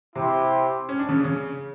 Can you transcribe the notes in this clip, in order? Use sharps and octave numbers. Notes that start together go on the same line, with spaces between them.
C3 C4 E4 G4 C5
C#4
D4
C#3 C#4
C#3 C#4